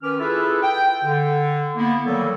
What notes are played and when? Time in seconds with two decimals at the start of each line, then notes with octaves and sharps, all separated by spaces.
0.02 D#3 C#4 B4 D6 F6
0.20 E4 F4 G#4 A4 B4 E5
0.61 G5
1.03 D3
1.76 A#3 B3 E4
2.04 D#3 E3 F#3 G3 A#3 A4